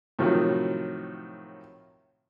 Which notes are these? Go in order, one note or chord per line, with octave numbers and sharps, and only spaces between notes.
A2 C3 D#3 F3 F#3